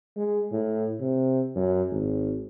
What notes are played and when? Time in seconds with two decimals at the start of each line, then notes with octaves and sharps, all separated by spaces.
0.17 G#3
0.52 A2
1.00 C3
1.56 F#2
1.91 G#1